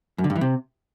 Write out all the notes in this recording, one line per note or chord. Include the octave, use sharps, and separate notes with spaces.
F#2
D3
G2
E3
C3